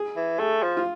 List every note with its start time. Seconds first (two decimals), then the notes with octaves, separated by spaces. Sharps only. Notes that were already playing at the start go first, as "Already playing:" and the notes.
Already playing: G#4
0.16 E3
0.39 A3 G#4
0.62 F3
0.77 F4